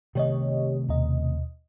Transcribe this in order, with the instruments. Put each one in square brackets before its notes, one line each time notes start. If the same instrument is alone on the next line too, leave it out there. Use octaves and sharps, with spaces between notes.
[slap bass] C3 D#3 A3 [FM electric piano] G4 C#5 D#5
[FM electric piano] D#2 B2 D#5